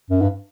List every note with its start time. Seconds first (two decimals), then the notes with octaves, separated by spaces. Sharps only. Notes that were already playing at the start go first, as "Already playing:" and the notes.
0.10 F#2
0.21 G2